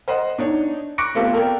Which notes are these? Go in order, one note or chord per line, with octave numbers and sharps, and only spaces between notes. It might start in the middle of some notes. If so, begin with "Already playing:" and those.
C5 D#5 F#5
D4 D#4 C#5
C#6 D6 F#6 A#6 C#7 D7
A3 B3 C4 F4 G4 A4
A4 A#4 D5 G5